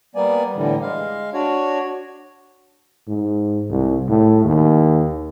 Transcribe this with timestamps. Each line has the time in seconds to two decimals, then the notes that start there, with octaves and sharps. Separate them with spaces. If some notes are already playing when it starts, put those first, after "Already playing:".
0.15 G3 A#3 B3 D5 G#5
0.55 A2 D3 E3 G3
0.82 G#3 F5
1.34 D4 F#4 C#5
3.08 G#2
3.70 C2
4.09 A2
4.44 D#2